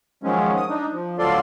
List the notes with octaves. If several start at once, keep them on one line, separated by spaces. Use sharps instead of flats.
D#3 F3 F#3 G#3 C#4
D#6
D4 D#4
F3
D2 F#3 F4 A4 D5 C6